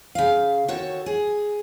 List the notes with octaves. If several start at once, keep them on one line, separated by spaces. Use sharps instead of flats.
C#3 F5
D#3 F#4 A4 C#5
G#4